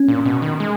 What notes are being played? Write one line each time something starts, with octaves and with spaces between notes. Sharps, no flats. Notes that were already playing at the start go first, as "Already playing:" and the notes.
Already playing: C#4
A#2
B2
D#3
G#3